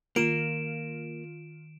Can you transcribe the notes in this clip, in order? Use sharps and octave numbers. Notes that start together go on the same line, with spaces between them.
D#3 A#3 F4 D7 E7